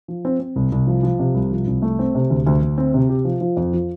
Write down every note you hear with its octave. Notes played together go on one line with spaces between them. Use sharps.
F3
C4
C4
C2
C2
F3
F3
C3
C2
F3
C2
A3
C4
C3
D2
D2
D2
C4
C3
G4
F3
F3
F2
F3